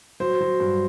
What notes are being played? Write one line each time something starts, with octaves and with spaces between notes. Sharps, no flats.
F#3 C5
F#3
G2